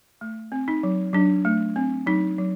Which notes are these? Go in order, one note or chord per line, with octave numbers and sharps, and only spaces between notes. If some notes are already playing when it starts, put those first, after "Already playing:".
A3
C4
D#4
F#3
F#3 D4
A3
C4
F#3 D#4
F#3